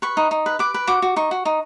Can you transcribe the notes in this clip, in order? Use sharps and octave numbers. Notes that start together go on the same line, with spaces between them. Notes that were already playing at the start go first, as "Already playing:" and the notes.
B4 C#6
D#4
D#4
B4
B4 D6
B4
F#4 D6
F#4
D#4 C#6
F#4
D#4